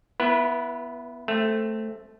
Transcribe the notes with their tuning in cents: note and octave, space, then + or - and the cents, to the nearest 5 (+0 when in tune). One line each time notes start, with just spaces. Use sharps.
B3 +0 E4 +20 B4 -30
A3 +0 C4 +0